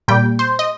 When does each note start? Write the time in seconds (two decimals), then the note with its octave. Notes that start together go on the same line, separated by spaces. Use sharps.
0.08 A#2 G3 G5
0.39 C5
0.59 D#5